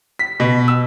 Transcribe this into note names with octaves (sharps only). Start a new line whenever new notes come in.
B6
B2
E6